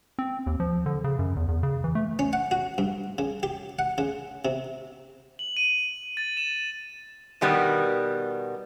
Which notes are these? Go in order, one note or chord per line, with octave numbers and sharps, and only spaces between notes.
C4
D#2
F3
D3
C#3
F#2
E2
E2
C#3
E3
A3
C#4
F#5
F#4
G2
C#3
G4
F#5
C#3
C3
F#7
D#7
A6
E7
B2 D#3 G3 B3